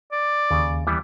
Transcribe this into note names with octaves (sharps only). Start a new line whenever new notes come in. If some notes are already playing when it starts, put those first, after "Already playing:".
D5
D#2 C#3
E3 G3 B3